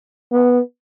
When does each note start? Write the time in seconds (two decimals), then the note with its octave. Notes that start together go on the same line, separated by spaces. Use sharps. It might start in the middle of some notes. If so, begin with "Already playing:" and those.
0.32 B3